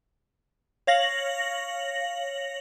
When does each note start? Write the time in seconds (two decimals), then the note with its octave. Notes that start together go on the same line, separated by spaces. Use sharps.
0.87 C#5 F5 A#6 F#7